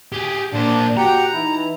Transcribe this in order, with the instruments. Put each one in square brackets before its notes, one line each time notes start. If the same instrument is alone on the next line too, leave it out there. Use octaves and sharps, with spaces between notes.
[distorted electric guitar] G4 G#4
[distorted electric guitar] A#2 C5 [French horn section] A#3 [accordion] D4
[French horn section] F#4 [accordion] G4 F#5 G5 [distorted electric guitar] A#5
[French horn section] E3 D#4 [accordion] E4